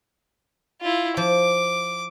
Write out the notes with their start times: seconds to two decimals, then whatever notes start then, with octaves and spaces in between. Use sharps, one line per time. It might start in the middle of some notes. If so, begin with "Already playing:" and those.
0.82 E4 F4
1.17 F3 D6